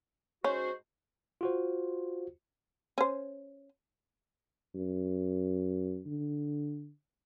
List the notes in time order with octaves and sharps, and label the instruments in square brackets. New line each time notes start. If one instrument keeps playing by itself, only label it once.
[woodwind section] G#2 F#4 C5 [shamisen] C#4
[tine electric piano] F4 F#4 C5
[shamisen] C#4 C5
[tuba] F#2
D3